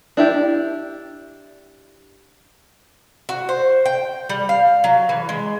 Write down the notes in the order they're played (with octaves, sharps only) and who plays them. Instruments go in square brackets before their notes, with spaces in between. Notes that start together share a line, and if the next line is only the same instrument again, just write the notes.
[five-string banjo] D4 E4 G4
[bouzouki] F#4
C5
G5
G3
F5
F#3
E3
G#3